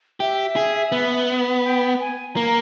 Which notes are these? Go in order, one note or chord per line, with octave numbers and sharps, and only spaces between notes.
G4 E5
G#4
B3
G5
G#5
A#3 A#5